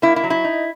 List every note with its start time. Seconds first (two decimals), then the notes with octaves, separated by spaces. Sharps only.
0.02 A#3 E4
0.16 E4
0.24 F#3
0.30 E4
0.44 D#4